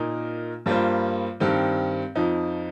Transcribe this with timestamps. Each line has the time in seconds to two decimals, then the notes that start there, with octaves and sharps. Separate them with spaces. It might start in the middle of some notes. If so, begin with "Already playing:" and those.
Already playing: A#2 A#3 D#4 A#4
0.66 G2 G3 A#3 F4 C5
1.40 G2 D#3 C4 G4
2.15 F2 F3 D#4